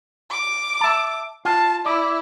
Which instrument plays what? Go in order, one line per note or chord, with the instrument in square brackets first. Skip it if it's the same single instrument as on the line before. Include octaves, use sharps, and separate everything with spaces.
[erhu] D6
[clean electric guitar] E5 A5
[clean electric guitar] F4 [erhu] A5
[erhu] E4 [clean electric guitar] D5